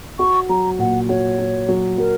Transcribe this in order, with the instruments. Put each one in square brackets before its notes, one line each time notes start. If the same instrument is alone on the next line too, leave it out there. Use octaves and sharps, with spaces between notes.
[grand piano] F#4 [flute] C#6
[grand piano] F#3 [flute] A#5
[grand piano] A#2 [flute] F#5
[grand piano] F#4 [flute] C#5
[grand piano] F#4
F#3
[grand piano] F#3 [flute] A#4